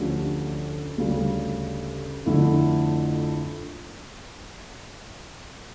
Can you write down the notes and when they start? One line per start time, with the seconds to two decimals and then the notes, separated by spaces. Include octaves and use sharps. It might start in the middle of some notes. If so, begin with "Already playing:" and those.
Already playing: D2 D3 F3 C#4 G4
0.98 D2 C#3 G3
2.26 F2 D3 A3 E4